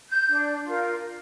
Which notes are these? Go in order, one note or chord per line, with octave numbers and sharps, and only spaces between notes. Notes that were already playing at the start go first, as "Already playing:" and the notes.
G6
D4
F4 A#4